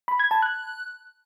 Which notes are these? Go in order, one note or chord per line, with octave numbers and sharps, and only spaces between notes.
B5
G#6
A5
F#6